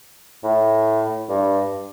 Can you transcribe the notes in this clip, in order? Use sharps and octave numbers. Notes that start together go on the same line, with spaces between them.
A2
G2